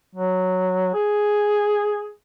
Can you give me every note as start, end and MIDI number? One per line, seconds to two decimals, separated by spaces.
0.16 0.93 54
0.94 2.10 68